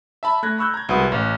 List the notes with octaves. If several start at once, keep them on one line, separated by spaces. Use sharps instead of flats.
E5 A5 B5
A3 F#6 G#6 A#6
B5 C#6 E6 F#6 G6
A#5 G#6
C2 G#3 F#4 B4 F#5 D#6
A1